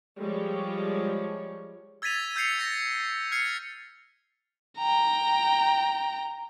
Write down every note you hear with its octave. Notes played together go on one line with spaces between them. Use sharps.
F3 G3 G#3 C#5
E6 G#6 A6 B6 D#7 F7
E6 G6 G#6 C7 C#7 F7
G6 A6 A#6
F6 G#6 C7 C#7
G5 A#5